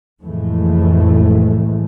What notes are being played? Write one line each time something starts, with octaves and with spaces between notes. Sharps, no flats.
C2 F2 A2 E3 G#3 A3